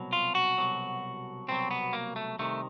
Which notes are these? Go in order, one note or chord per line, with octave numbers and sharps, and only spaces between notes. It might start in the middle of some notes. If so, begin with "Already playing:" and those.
Already playing: C2 B2 F#3
F4
F#4
C2 B2 F#3
C2 B2 F#3 C4
B3
A#3
A3
C2 C3 D#3 A3